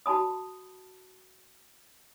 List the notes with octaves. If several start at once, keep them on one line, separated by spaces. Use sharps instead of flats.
F#4 A5 B5 D#6